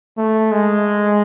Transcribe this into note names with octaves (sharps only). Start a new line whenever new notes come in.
A3
G#3